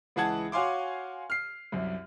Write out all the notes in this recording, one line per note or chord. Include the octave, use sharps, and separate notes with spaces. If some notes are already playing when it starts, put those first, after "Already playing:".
C#2 E3 G#4 F#5 A5 G#6
F#4 C#5 F5 G#5 C6 D6
F6 C7
C2 F#2